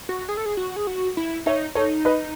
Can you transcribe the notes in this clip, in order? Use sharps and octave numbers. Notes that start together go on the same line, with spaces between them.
F#4
G#4
A4
G#4
F#4
G#4
F#4
E4
D#4 C#5 E5
D#4 A4 C#5
B4 D#5